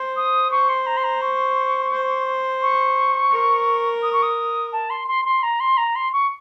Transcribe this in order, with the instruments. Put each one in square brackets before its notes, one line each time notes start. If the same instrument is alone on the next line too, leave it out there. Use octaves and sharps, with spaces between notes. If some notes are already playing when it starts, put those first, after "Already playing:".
Already playing: [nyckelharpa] C5
[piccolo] D#6
[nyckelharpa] C5 [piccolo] C#6
[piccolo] C6
A#5
C6
A#5
C#6
[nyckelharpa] C5
[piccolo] C#6
[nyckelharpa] A#4
[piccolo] D#6
C#6
D#6
A5
C6
C6
C6
A#5
C6
A#5
C6
C#6